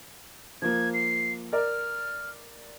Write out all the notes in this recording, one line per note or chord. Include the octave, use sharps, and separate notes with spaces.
F3 A#3 G#6
C7
A#4 D5 F6